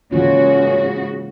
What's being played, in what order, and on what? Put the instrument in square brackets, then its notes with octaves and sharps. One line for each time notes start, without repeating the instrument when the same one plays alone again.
[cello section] G#2 C#3 F#4 [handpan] E3 A#3 F4 [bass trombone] C#4